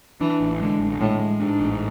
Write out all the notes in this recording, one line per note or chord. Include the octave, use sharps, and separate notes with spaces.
E3 D4
A1
D3 G#3
A1
A2 G#3
G#3
G#2 D4
A1